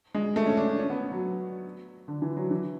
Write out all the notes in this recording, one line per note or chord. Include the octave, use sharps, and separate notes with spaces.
G#3
A3
C#4
D4
D4
C#4
B3
F#3
D3
E3
F#3
E3